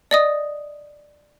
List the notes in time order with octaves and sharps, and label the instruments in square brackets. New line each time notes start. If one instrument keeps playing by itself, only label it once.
[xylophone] D5 D#5 D#6